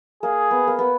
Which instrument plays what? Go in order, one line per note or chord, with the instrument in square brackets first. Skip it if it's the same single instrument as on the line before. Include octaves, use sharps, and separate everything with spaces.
[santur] A#3 [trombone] G#4
[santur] B3
A#3
B3